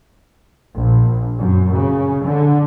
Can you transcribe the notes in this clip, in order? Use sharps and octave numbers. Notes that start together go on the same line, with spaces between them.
A#1
F#2
C#3
D3